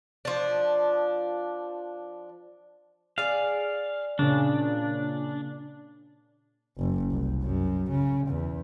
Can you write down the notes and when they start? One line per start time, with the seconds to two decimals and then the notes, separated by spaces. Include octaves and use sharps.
0.25 F3 D4
3.18 G#4 D5 F5
4.19 A#2 C#3 D4
6.78 F#1
7.11 C2
7.43 F#2
7.91 C#3
8.28 E2